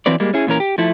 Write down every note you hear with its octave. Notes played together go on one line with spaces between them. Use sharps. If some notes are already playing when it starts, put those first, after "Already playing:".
E3 F#3 C4 B4 D5
G3 G#3 A#3
C#4 E4 G#4
A#2 E3 C#4 A#4
G4
F3 A3 E4